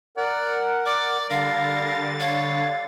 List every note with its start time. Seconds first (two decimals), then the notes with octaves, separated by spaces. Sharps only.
0.17 A#4 D5 F#5
0.86 D5 D6
1.30 D3 G3 A#4 F5 A6
2.21 C#5 F5